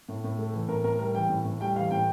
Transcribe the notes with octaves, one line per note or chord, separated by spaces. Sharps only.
A2
A2
A3
E3
A2 A#4
A2 A#4
G3 A#4
E3 G5
A2
A2
G3 G5
E3 F5
A2 G5